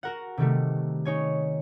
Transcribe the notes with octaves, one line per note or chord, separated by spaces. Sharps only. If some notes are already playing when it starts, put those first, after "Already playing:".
F#4 A#4 F#5
C3 D#3 G3 A3
D#4 C#5 G#5